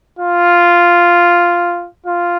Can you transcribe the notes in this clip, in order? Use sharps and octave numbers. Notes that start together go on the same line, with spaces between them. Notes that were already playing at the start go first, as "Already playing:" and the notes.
F4
F4